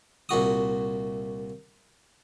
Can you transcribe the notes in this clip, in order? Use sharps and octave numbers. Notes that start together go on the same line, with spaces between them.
C2 A#2 F#4 D#6